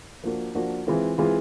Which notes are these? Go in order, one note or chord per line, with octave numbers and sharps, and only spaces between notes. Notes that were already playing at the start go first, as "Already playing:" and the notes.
F3 A#3 D4 F#4
F3 A#3 D4 F#4
E3 G#3 C4 F4
E3 G#3 C4 F4